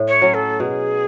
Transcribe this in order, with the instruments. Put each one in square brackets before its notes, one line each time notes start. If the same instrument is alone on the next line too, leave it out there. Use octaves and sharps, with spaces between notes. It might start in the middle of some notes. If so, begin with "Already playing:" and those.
Already playing: [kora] A2
[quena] C#5
[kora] F#3 C#4
[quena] A4
[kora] B2 [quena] G#4